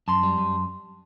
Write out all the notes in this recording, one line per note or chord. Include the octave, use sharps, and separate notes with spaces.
F#2 A5 C6
G3
F#2